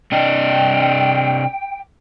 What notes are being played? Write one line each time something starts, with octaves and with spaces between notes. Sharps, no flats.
C3 D4 D#5 G5